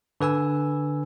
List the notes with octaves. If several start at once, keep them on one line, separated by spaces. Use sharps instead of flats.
D3 B4 G#5 E6